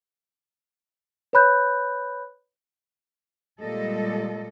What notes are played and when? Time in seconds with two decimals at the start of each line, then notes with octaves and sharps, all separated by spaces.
1.33 B4 C#5 B5 F#6 G6
3.60 A#2 G3 G#3 A4 D#5